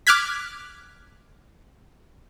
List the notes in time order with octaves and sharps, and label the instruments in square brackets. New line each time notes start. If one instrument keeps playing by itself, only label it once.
[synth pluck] D6 F6 F#6 G#6 B6